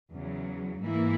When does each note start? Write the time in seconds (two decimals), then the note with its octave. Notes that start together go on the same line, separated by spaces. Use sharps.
0.14 E2 C#3 F#3
0.82 G#2 E3 A#3 E4